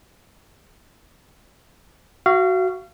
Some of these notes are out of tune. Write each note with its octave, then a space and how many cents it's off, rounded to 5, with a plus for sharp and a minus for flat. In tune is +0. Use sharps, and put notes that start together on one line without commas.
F#4 +10 F5 -30